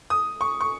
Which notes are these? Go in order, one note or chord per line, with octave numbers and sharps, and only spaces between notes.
D#6
C#6
C#6